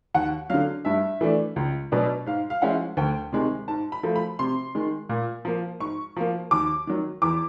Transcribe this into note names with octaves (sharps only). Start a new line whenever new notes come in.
D#2 F#5
D3 F#3 F5
G2 E5
E3 A3 D4
C#2
B2 F#3 B3 D4
G#2 F5
F5
F3 G#3 C#4 E4 F#5
D2 G5
C3 D#3 G#3
G#2 A5
B5
F3 A3
B5
C3 C6
D#3 G#3
A#2
F3 A#3
G#2 C#6
F3 A#3
D#2 D6
D#3 F#3
E2 D6